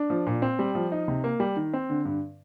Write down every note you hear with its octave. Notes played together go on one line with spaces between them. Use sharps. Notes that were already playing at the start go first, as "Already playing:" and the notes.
Already playing: D4
F3
A#2
C4
G3
F3
D#4
C3
A#3
G3
D#3
C4
D3
G2